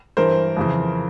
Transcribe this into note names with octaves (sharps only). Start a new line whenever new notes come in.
G2 E3 A#4 C5
F2 C#3 E3